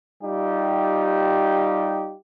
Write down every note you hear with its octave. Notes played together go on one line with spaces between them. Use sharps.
G3 D#4 F4 G4